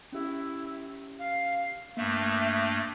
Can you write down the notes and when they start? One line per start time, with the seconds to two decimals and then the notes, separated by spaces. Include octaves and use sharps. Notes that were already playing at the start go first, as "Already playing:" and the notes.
0.12 C#4 E4 G4 E5
1.19 F5
1.97 G2 A3 A#3 E5